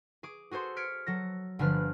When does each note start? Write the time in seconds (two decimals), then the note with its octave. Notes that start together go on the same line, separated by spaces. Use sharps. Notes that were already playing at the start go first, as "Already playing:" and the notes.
0.23 G#4 D6
0.51 F#4 G#4 A4 C5 C6
0.76 F6 G#6 B6 C#7 D7
1.07 F#3 A4 A#6
1.59 G1 D3 F3 D4 B4 F6